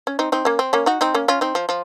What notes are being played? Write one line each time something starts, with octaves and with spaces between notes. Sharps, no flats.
C#4
C4 D#4
C4 D#4
A#3 C#4
C4
A#3 C#4
D#4 F#4
C4 D#4
A#3 C#4
C#4 F4
C4 D#4
F3
F3